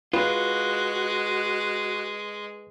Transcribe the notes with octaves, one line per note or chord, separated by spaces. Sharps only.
G#3 F4 F#4 B4